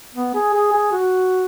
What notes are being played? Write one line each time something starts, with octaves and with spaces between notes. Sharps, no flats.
B3
G#4
G#4
G#4
F#4